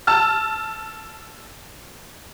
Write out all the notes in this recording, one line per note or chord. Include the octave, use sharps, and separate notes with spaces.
A5 E6 F6